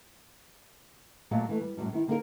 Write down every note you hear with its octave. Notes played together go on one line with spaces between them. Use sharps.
A#2 F#3 A3 G4 D5 F5
E3 A3
G3
F#2 A2 C3 F#3 G3
D#3 E4
D3 A#3 B3 D#4 G#4 A#4